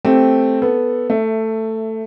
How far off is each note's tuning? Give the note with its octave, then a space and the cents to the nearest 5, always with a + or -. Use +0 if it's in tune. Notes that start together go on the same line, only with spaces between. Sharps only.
A3 +0 C4 +0 G4 +0
B3 +0 A4 +0
A3 +10 E5 +0